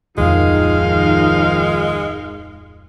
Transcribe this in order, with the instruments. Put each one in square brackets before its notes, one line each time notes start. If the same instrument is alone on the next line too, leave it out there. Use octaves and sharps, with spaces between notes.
[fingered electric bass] D1 F2 [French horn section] D#3 F3 F4 [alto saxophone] G#3 [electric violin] D#4 F5